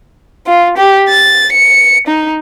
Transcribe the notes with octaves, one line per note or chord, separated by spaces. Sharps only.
F4
G4
A6
C#7
D#4